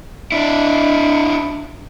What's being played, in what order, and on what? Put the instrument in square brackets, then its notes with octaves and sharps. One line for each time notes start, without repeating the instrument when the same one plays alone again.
[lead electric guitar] D4 E4